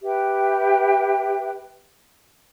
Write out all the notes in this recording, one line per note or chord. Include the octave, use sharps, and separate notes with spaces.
G4 B4 E5 G5